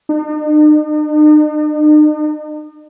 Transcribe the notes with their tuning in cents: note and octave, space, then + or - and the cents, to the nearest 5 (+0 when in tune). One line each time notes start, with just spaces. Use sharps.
D#4 -45